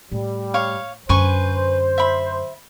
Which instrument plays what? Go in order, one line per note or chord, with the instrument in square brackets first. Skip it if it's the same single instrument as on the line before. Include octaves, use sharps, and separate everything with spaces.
[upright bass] A2 [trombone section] G3
[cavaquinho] C#5 F5
[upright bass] F#2 D3 [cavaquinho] B4 G#5 C#6 [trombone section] C5
[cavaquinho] E5 B5